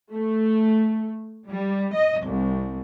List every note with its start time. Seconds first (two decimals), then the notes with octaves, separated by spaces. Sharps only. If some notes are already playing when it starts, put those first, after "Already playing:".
0.11 A3
1.48 G3
1.94 D#5
2.24 C2